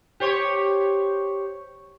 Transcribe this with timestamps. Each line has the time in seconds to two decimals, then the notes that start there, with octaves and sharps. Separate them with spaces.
0.20 G4 C5 C#5